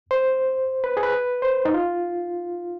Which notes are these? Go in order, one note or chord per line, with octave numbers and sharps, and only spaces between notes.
C5
B4
G#4
B4
C5
D#4
F4